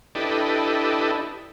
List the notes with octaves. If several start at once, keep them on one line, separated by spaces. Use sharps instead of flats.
D4 E4 G4 A4 B4 D#5